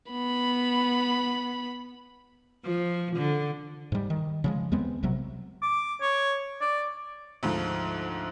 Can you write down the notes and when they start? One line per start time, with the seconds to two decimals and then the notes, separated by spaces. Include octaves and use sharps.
0.12 B3 B5
2.65 F3
3.17 D3
3.92 G#2 G3
4.10 D#3
4.44 C#3 F3 G#3
4.72 D#2 G#3 B3 C4
5.03 A#1 C3 F#3
5.62 D6
6.01 C#5
6.61 D5
7.43 D2 G#2 F3